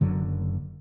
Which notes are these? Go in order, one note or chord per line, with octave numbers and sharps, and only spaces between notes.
F#1 F#2 D3 F#3